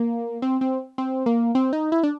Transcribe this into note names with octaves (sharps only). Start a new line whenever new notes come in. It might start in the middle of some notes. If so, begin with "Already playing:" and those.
Already playing: A#3
C4
C4
C4
A#3
C4
D#4
E4
D4